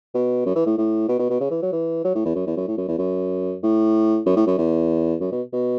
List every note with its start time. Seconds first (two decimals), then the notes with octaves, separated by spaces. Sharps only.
0.14 B2
0.45 F#2
0.55 E3
0.66 A2
0.77 A2
1.08 B2
1.19 B2
1.30 B2
1.40 C#3
1.51 E3
1.62 F#3
1.73 E3
2.05 F#3
2.15 A2
2.25 E2
2.35 F#2
2.46 E2
2.57 F#2
2.68 A2
2.77 F#2
2.88 E2
2.99 F#2
3.63 A2
4.26 F#2
4.36 A2
4.47 F#2
4.58 E2
5.20 F#2
5.32 B2
5.53 B2